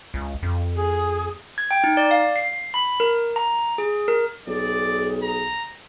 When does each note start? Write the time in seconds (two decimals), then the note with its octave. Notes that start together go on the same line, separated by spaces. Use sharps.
0.14 C#2
0.43 F2
0.76 G#4
1.58 G#6
1.71 G5
1.84 D#4
1.97 D5
2.11 F5
2.36 C7
2.74 B5
3.00 A#4
3.36 A#5
3.78 G#4
4.08 A#4
4.47 B1 G#4 D5
5.23 A#5